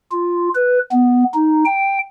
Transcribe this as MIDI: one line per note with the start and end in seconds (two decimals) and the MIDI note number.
0.11 0.49 65
0.55 0.79 71
0.92 1.24 59
1.34 1.64 63
1.65 1.99 79